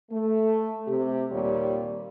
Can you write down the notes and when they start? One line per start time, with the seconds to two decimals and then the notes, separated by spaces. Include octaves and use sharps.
0.11 A3
0.87 C3 G4
1.32 D#2 A#2 G3 C#5 D5